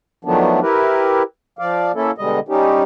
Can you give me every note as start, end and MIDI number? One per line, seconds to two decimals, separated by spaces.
0.25 0.60 51
0.25 0.60 53
0.25 0.60 54
0.25 0.60 57
0.25 0.60 59
0.25 0.60 62
0.62 1.23 64
0.62 1.23 67
0.62 1.23 70
0.62 1.23 71
1.59 1.92 53
1.59 1.92 74
1.59 1.92 77
1.95 2.11 58
1.95 2.11 61
1.95 2.11 64
1.95 2.11 69
2.18 2.40 47
2.18 2.40 50
2.18 2.40 55
2.18 2.40 56
2.18 2.40 75
2.48 2.83 55
2.48 2.83 61
2.48 2.83 63
2.48 2.83 67